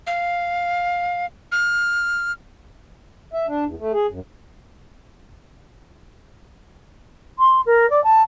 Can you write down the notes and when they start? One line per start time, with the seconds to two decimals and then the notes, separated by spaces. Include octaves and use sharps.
0.07 F5
1.52 F6
3.33 E5
3.47 D4
3.65 E2
3.79 A3
3.93 G#4
4.10 F#2
7.39 C6
7.66 A#4
7.90 D5
8.04 A5